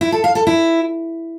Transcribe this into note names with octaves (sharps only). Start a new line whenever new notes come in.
E4
A4
F5
A4
E4